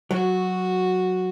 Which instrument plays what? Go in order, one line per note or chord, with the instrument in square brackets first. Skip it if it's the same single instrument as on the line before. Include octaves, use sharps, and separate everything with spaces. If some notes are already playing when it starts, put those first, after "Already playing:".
[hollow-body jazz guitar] F#3 [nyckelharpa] F#4